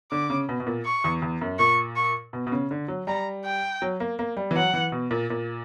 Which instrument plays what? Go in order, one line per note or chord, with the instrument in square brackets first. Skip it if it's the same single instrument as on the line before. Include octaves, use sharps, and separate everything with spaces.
[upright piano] D3 [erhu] D6
[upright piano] C#3
B2
B2
A#2
[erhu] C#6
[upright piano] E2
E2
F#2
[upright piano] A#2 [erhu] C#6
[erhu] C#6
[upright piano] B2
B2
C#3
D3
F#3
[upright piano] G3 [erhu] A#5
[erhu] G5
[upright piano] F#3
A#3
A#3
G3
E3
[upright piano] F#3 [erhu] F#5
[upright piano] E3
B2
A#2
A#2